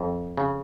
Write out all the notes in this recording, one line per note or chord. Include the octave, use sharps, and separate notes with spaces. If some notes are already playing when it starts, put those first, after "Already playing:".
Already playing: F2
C#3